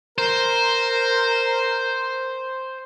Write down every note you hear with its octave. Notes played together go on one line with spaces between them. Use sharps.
A#4 C5